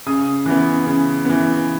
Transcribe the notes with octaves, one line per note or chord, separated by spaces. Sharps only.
C#3 D#6
E3 B3
C#3
E3 B3